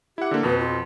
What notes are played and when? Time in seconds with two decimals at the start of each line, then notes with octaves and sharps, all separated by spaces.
0.18 E4 G4 F#5
0.31 D3 A#3
0.43 F2 B2 B4
0.59 F4